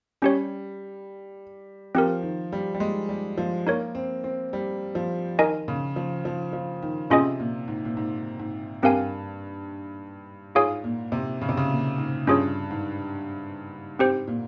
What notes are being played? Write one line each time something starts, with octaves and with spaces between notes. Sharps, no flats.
G3 C#4 G4 C#5
F3 C4 G4 A#4
D#3
G3
G3
G#3
G3
F3
A#3 D#4 A#4 C#5
C4
C4
G3
F3
D#3 D#4 A#4 D#5 G#5
C#3
F3
F3
F3
D#3
C3 C#4 F4 G#4 D#5 G#5
A#2
G#2
A#2
G#2
G#2
G2 C4 G4 A#4 F5 G#5
G#2 F4 G#4 C#5 F5 G#5
A#2
C3
C#3
C3
C#3
A#2
G#2
G2 C#4 F4 G#4 C#5
G#2
G#2 C4 G4 C5
A#2